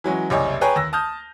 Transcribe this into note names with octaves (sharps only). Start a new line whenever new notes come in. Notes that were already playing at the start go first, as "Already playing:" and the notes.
E3 F#3 G#3 C#4
F#1 C2 G4 C#5 D#5 G#5
G#4 B4 C#5 G5 G#5 A#5
D#2 E6 A#6
A5 D#6 F6 G6